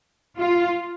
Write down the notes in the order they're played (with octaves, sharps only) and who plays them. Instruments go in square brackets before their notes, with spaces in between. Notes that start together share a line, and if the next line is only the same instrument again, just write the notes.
[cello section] F4